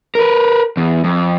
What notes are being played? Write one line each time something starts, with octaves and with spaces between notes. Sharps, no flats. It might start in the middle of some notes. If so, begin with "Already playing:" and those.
A#4 B4
E2
F2